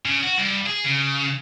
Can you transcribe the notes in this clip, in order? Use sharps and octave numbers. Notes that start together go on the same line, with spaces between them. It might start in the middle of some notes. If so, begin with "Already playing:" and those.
C#3
F#4
G2
G#4
C#3